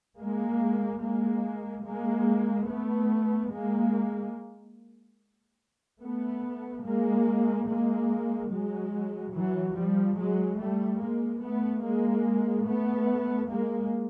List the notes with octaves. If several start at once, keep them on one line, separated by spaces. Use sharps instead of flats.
G#3 A#3
G#3 A#3
G#3 A#3
A3 B3
G#3 A#3
A3 B3
G#3 A#3
G#3 A#3
F#3 G#3
E3 F#3
F3 G3
F#3 G#3
G3 A3
G#3 A#3
A3 B3
G#3 A#3
A3 B3
G#3 A#3